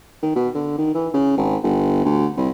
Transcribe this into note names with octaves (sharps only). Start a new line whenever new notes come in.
D#3
B2
D3
D#3
E3
C#3
G#1
G1
D2
C2